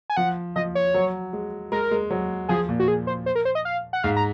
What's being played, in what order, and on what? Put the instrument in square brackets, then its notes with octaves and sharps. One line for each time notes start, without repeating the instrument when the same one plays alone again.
[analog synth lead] G#5
[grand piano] F3 [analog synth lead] F#5
[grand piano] F3 [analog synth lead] D#5
[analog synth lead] C#5
[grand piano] F#3
G#3
[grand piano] G#3 [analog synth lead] A#4
[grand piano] G#3
F#3
[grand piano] F3 [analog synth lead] G#4
[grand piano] A#2
[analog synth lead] F#4
G#4
C5
C5
A#4
C5
D#5
F5
F#5
[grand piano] G#2 [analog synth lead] F5
[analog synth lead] A#5